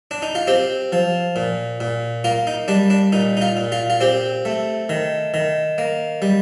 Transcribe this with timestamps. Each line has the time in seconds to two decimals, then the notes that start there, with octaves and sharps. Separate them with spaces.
0.11 D4
0.22 D#4
0.35 F4
0.47 C4 G4
0.92 F3
1.36 A#2
1.80 A#2
2.24 A#3 F4
2.47 D#4
2.68 G3 D4
2.90 D4
3.12 A#2 D#4
3.37 D#4
3.42 F4
3.57 A#2
3.72 F4
3.90 F4
4.01 C4 G4
4.45 A3
4.89 D#3
5.34 D#3
5.78 A#3
6.22 G3